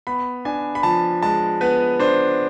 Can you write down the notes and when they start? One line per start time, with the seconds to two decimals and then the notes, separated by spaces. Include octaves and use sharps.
0.07 B3 B5
0.45 D4 G#5
0.75 B5
0.83 F3 A5
1.22 G#3 A5
1.61 B3 B4
1.99 D4 C5